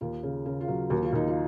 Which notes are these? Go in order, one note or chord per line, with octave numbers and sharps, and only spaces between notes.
D#2 F4
C#3
C#3
F4
F#3
D#2 F#4
F4
D#2 D#4
F4